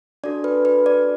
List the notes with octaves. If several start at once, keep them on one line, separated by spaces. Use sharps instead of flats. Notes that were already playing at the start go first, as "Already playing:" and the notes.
D4 F#4 A4 D5
B4
B4
D5